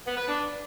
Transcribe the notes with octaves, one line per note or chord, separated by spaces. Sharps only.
B3
B4
D4